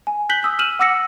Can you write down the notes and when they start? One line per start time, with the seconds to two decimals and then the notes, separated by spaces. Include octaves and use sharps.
0.07 G#5
0.29 F#6 G6 B6 F#7 G7
0.43 D#6 E6 B6
0.59 F6 D#7 E7 F#7
0.79 F#5 D6 E6 A#6 C#7